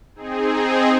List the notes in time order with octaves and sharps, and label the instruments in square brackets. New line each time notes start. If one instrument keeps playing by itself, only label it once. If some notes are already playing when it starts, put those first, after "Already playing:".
[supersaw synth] C4 D#4 G#4